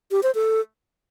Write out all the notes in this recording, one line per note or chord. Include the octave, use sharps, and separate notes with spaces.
G4
C5
A4